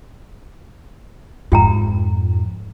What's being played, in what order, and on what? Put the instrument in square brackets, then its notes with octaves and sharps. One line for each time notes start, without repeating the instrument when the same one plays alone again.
[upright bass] F2 G#2 [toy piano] F4 G5 A#5